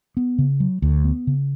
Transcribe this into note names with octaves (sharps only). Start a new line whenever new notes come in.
B3
C#3
F#3
D2
B3
C#3